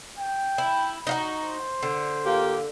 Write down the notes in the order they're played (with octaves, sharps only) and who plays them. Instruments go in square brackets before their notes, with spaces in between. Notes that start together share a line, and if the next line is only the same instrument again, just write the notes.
[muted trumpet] G5
[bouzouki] E4
D#4 F4 F#4
[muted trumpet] C5
[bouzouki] D3
[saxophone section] A#3 F4 G4